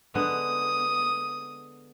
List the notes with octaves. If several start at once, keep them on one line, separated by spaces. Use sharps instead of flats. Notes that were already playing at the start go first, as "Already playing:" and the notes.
D3 G#3 B3 D#6